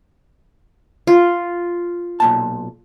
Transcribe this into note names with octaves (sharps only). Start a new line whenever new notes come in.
F4
B1 A#2 A5